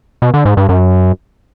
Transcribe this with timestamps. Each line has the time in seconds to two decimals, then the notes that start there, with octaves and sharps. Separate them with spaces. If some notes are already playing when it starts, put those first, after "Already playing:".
0.22 B2
0.34 D3
0.45 G#2
0.57 G2
0.69 F#2